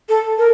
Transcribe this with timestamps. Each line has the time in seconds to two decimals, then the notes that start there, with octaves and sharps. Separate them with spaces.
0.09 A4
0.38 A#4